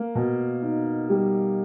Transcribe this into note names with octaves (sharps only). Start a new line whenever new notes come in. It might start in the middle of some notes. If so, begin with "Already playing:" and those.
Already playing: A#3
B2
D#4
G3